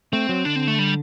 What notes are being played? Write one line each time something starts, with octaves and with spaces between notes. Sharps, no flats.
A3 C4
F#3
D3 D4
C4
A3
G3